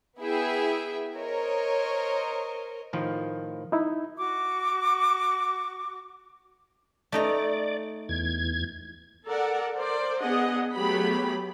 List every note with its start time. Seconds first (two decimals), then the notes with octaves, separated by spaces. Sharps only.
0.19 B3 E4 G#4 E5 G5
1.18 A#4 C5 C#5 D#5
2.93 A2 D#3 F3
3.72 D#4 E4
4.17 F#4 C#6 D6
7.12 A3 D#4 D5 A#5
8.09 E2 G#6
9.26 A4 A#4 D5 F#5
9.76 A#4 C5 D5
10.21 B3 D4 G#4 D#5 F#5
10.75 F#3 A3 B3 G4 G#4 B5